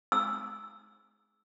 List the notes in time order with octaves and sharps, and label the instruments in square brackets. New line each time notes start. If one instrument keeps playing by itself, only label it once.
[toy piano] E6